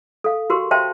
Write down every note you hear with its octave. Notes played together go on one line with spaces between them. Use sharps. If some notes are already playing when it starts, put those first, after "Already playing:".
A4 F5
F#4 G4 A#4 C6
C5 E5 F5 G5 A5 C6